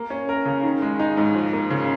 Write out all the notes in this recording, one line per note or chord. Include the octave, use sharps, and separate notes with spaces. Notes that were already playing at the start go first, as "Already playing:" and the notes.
Already playing: A#3
C#4
A#4
C#3
D#3
G#3
D#4
G#2
F3
A#3
C#3